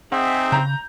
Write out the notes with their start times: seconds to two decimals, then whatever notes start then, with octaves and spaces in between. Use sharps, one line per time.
0.12 C4 D#4 G#4 E5 F#5
0.52 C#3 A#5 G6